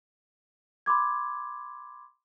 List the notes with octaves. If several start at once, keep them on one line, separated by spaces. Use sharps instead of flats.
B5 C6 D6 G#6